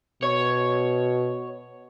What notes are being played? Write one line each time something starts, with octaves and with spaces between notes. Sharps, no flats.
B2 C#5